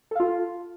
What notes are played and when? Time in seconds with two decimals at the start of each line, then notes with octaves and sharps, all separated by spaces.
0.11 A4
0.15 F5
0.20 F4